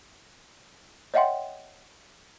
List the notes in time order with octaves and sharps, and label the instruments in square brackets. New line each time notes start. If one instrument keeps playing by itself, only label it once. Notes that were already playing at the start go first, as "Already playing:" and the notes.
[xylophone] C#5 D#5 E5 F#5 G5 C6